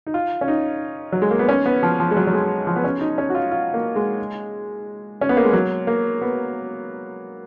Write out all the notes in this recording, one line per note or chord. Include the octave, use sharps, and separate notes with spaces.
D#4
F4
C#4
D#4
F#3
G#3
A#3
B3
C#4
B3
F3
F3
G#3
F#3
F#3
G#3
F3
B3
C#4
D#4
C#4
F#4
F4
F4
A#3
G#3
C#4
B3
A#3
G#3
F#3
A#3
B3